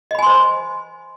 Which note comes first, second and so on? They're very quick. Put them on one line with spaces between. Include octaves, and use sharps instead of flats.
D#5 B5 G#5 C6 C5